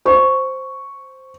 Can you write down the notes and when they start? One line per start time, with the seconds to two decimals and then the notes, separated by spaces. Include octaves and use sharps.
0.05 C5 C#6